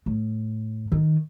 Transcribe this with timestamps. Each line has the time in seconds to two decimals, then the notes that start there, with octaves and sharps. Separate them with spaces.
0.06 A2
0.92 D#3